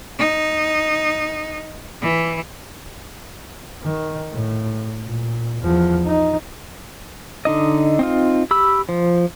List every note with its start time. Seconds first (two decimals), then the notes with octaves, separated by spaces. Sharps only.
0.18 D#4
2.02 E3
3.83 D#3
4.31 A2
5.05 A#2
5.61 E2 F3
6.05 D#4
7.45 D3 D#4 D#5
7.99 C4 D#4 F4
8.51 G4 B5 E6
8.89 F3